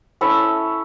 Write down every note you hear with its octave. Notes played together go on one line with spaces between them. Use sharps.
C#4 E4 A4 C#5